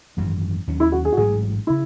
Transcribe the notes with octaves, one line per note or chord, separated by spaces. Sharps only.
G#1 F#2 E3 A3
D#2 D#3 F#3 C#4
E4
F#4
G#4
F#4
A1 G#2 F#3 A3 G#4
C#3 E4